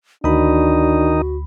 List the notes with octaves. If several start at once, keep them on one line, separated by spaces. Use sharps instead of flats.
D2 D#3 D4 D#4 F#4 B5